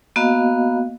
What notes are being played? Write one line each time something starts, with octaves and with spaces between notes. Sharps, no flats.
A#3 B3 F#4 D#5 F5